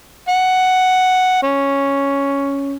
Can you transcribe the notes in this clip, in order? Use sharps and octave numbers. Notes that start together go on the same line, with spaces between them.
F#5
C#4